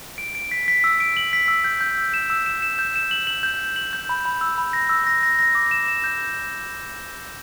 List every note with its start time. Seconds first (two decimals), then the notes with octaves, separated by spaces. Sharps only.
0.18 D7
0.35 D7
0.51 B6
0.68 B6
0.84 E6
1.00 D7
1.17 F#7
1.33 B6
1.48 E6
1.64 G6
1.81 G6
1.98 E6
2.14 E7
2.30 E6
2.46 E7
2.62 E7
2.79 G6
2.96 E7
3.11 F#7
3.27 F#7
3.43 G6
3.60 G6
3.76 F#7
3.93 G6
4.09 B5
4.25 B5
4.41 E6
4.58 B5
4.73 A#6
4.89 E6
5.07 A#6
5.23 A#6
5.39 A#6
5.55 D6
5.71 E7
5.88 E7
6.04 G6